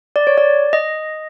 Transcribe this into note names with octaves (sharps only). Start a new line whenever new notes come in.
D5
C#5
D5
D#5